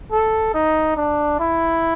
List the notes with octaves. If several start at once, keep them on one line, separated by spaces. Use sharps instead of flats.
A4
D#4
D4
E4